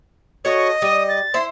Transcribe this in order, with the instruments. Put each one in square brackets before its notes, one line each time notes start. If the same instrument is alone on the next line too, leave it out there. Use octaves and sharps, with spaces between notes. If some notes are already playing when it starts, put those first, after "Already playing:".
[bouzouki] F#4 A4 C#5 [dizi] D#5 [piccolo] C#6
[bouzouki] G3 [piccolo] D#6
[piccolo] A6
[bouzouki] E4 C5 [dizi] C6